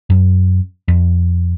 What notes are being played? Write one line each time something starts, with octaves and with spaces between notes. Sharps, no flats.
F#2
F2